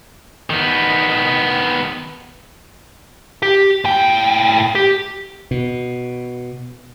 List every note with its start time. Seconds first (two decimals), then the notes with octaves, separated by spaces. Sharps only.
0.50 D#3 B3
3.42 G4
3.85 A2 G5
4.75 G4
5.51 B2